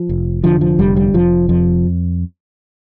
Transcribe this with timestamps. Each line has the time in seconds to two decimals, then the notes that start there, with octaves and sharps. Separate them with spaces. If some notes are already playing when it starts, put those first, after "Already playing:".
Already playing: F3
0.09 F1
0.44 D3 F3
0.61 F3
0.79 F1 G3
0.96 G3
1.14 F1 F3
1.49 F2 F3